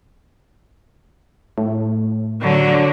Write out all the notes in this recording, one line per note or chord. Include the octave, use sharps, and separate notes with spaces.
A2
D3 F#3 D4